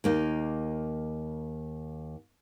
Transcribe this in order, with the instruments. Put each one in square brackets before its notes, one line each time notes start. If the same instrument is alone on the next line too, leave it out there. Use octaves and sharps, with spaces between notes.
[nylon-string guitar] D#2 A#3 D#4